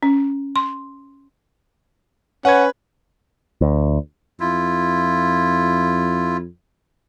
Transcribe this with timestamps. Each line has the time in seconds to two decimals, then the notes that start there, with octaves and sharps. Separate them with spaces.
0.03 C#4
0.56 C6
2.45 C#4 B4 F#5 G#6
3.61 D2
4.40 F2 E4 F4